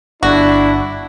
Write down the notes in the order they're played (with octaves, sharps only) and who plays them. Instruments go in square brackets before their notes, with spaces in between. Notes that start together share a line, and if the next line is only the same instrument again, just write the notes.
[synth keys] G1 [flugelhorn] D4 [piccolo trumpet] E4 [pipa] F#4